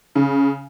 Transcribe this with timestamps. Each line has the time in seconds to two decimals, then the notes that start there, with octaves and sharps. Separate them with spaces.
0.15 C#3